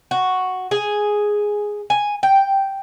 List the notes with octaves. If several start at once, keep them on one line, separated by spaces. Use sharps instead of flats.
F#4
G#4
G#5
G5